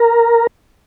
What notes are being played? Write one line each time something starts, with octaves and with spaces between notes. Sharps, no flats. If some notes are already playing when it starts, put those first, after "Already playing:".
Already playing: A#4